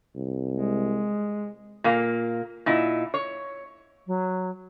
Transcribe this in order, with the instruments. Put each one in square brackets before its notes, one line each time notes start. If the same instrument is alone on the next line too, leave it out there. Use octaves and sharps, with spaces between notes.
[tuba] C2
[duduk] G#3
[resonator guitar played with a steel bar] A#2 A#3
A#2 D#4 E4
C#5
[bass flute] F#3